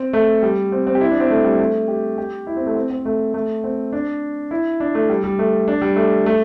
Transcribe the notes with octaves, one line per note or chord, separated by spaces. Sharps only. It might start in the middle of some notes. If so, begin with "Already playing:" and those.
Already playing: C4
A3
G3
C4
C4
G4
E4
D4
C4
A3
G3
A3
G4
G4
E4
C4
A3
C4
C4
A3
A3
C4
D4
E4
D4
A3
G3
G3
A3
D4
G3
A3
A3